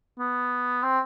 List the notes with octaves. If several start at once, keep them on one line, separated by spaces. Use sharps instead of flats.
B3
C4